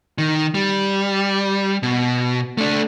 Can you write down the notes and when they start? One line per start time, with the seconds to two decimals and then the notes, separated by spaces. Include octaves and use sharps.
0.18 D#3
0.54 G3
1.83 B2
2.58 A3 D4